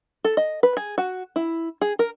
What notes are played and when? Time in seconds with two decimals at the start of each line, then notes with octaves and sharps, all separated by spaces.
0.24 A4
0.37 D#5
0.63 B4
0.77 G#4
0.98 F#4
1.36 E4
1.81 G#4
1.99 A#4